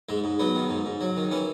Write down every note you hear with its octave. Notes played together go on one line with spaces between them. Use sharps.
G#2 G#3
G#2
F#3 B3
D#3
G#2
G#2
F#3
D#3
E3 C#4